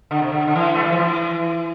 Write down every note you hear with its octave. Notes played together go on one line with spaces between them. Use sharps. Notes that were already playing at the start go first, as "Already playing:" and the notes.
D3
C3
D3
D3
E3
A3
G3
F3
E3